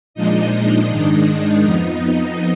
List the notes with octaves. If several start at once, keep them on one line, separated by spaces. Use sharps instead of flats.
A#2 F3 G#3 D4 D#4 D#5
G#2 D#3 G#3 D4
F2 F3 B3